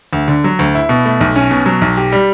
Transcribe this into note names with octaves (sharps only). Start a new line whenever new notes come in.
D2
D3
F#3
D2
E4
B2
A3
B1
C#4
B2
F#3
B1
G4
G3